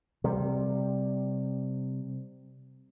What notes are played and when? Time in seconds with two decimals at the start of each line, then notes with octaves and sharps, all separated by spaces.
0.24 C3 G3